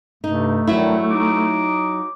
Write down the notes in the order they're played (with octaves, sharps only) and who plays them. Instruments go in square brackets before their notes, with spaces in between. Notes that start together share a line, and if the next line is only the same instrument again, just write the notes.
[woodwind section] G2 C3 [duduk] A3 [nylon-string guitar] D#4
[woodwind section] G2 D#3 G3 [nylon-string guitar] F#3 E4
[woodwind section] D#4 D6